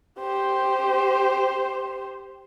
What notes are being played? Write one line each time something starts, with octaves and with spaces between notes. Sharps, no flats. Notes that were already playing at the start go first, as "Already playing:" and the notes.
G4 C5